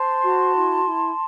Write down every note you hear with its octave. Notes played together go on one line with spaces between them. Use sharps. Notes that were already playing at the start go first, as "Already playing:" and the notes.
Already playing: C5 A5 C6
F#4
E4
E4